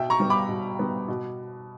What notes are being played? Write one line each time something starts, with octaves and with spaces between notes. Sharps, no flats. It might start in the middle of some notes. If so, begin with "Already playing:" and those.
Already playing: B2 E5 G5
A#5 C#6
G3 B3
B5 D6
B2
G3 B3
B2